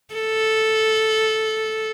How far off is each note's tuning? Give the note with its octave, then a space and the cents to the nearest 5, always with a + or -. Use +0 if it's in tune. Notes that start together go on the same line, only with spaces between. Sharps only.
A4 -5